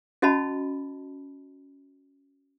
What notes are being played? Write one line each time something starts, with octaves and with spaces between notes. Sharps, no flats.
C#4 F#4 D#5 A5 B5